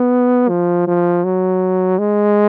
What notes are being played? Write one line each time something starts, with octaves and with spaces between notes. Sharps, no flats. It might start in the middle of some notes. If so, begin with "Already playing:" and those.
Already playing: B3
F3
F3
F#3
G#3